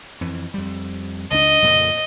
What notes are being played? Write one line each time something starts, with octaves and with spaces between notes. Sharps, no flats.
F2 E3
F2 G3
C#2 G#3 D4 D#5
F2 A#2 C#3